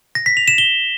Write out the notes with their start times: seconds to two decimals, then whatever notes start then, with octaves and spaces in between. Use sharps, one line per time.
0.15 A#6
0.26 B6
0.37 F7
0.48 E7
0.58 G7